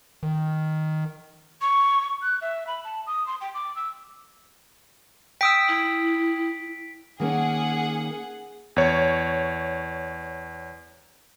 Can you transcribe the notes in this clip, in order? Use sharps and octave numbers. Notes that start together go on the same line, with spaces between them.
D#3
C#6
F#6
E5
B5
A5
D#6
C6
G5
D6
E6
G5 D#6 E6 B6 D7
E4
D#3 A#3 C#4 G#4 F#5
E2 C#5